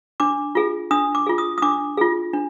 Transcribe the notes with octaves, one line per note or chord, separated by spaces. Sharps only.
D4 D6
F4 G#4
D4 D#6
D6
F4 G#4
D#6
D#6
D4 D6
F4 G#4
D4